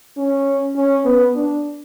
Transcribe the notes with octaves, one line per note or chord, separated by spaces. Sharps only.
C#4
C#4
B3
D4